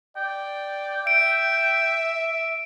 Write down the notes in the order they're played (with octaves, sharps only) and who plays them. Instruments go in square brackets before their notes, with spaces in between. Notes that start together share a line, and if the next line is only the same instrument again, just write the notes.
[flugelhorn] D5 [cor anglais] G5
[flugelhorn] E5 [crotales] D7